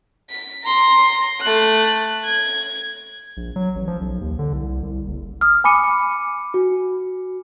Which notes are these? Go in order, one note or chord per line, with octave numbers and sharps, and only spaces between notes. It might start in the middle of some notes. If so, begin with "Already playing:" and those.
B6
A#5 C6
A3 F#6
G#6
A#1
F#3
A1
F3
B1
D#2
D3
C2
C2
F#1
D#6 F6
G#5 B5 D6 C#7 D#7
F#4